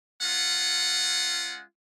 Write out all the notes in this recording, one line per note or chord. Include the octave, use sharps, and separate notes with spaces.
G#3 C#4 F4 F#5